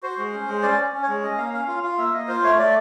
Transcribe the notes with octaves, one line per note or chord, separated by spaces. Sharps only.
F#4 C5
G#3
C#4
G#3
C#4 D5
C#4
C#4
C#5
G#3
C#4 D#5
A#3 F5
C#4 F5
F4 F5
F4 F5
A#3 E5
A#3 D#5
F4 C5
A3 C#5
A3 D5